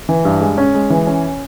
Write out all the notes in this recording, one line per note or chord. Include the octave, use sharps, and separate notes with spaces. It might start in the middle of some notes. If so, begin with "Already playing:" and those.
E3
G2
G#3
C#4
G#3
E3
C#4